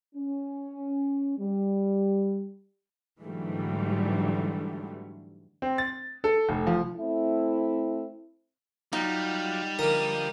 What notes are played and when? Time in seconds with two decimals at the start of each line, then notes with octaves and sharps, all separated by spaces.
0.15 C#4
1.38 G3
3.21 G#2 D3 E3 F#3 G3 A3
5.62 C4
5.78 A6
6.24 A4
6.49 F1
6.67 F3
6.96 A3 C4 E4
8.93 F#3 G3 D#4 F4
9.79 D3 F3 A#3 A#4 D#5